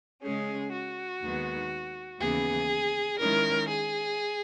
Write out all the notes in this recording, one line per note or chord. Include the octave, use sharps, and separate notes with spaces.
C#3 G#3 C#4 G#4
F#4
D#2 D#3 G#3 B3
D#2 C#3 E3 B3 G#4
D#3 G#3 C#4 E4 A#4
G#4